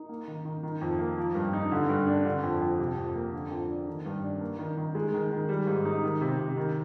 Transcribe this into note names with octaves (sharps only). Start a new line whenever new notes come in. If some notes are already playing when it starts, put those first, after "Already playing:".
Already playing: D#4
A#3
D#3
D#3
D#3
F2
A#3
F3
G2
D#4
D3
G2
D4
D3
F2
F2
C3
F2
A#3
D3
F2
D4
D#3
G2
D4
A#3
D#3
D#3
G#3
D#3
D#3
G3
G#2
D#4
D#3
C3
C3
D#3